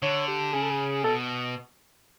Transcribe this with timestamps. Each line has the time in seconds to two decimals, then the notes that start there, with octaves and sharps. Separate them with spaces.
0.02 D3 C#5
0.28 G4
0.53 C#3 G#4
0.62 A4
0.71 G#4
1.03 B2 A4